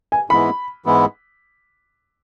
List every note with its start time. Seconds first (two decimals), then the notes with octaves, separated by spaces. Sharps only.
0.12 G#5
0.30 G#2 E3 G#3 B3 E4 B5
0.85 G#2 E3 G#3 B3 E4